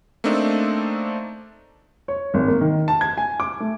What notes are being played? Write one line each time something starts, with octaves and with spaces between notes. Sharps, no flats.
A3 A#3 C4 D4 D#4 A4
C#5
G#1
A#3
D#3
A5
G#6
G#5
D6
A3